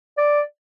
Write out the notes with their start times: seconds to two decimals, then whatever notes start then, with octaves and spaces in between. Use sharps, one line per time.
0.18 D5